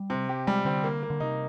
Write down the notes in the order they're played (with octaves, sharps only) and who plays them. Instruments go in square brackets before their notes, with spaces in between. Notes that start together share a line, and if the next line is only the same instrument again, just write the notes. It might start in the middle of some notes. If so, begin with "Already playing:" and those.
Already playing: [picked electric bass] G3
[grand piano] C3
G4
[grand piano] G3 [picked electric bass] G#3
[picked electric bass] D3 [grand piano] C4
[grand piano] A#3
A#3
[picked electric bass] D3
[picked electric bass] C3 [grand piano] D#4